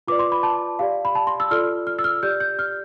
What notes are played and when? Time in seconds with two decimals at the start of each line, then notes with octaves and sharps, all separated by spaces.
0.08 F4 B4 D5 D6
0.19 C6
0.32 B5
0.43 A5
0.79 G4 D5 F5
1.05 B5
1.15 A5
1.27 C6
1.40 E6
1.51 F4 A4 D5 F6
1.87 F6
1.99 E6
2.04 F6
2.23 G4 D5 G6
2.40 G6
2.59 F6